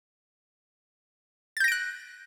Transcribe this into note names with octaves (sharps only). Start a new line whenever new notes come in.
F#6 G6 A6 A#6 D7